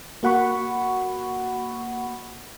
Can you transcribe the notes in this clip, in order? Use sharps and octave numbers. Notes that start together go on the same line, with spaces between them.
A#3 F#4 F#5 B5 C#6